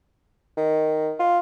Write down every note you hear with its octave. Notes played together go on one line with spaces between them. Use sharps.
D#3
F4